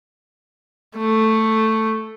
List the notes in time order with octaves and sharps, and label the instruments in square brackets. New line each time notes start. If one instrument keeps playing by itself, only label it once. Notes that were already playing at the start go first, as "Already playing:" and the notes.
[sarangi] A3